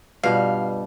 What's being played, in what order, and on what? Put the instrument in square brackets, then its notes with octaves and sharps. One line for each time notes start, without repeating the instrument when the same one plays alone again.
[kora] G2 B2 G3 [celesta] F4 B4 D5 [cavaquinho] F5